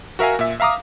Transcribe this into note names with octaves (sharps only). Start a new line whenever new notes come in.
F#4 A#4 E5 F5 G#5
A#2 E5
E5 F5 A#5 D6 D#6